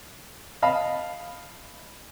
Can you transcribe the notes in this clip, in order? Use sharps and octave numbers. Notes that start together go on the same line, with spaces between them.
D#5 F5 A5 B5